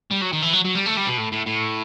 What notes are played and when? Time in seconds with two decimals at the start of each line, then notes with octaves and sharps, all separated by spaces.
0.11 G3
0.22 F#3
0.33 D#3
0.42 E3
0.53 F#3
0.65 F#3
0.75 G3
0.86 A3
0.97 G3
1.07 B2
1.17 A2
1.32 A2
1.46 A2